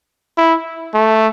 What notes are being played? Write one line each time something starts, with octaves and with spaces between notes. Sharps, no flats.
E4
A3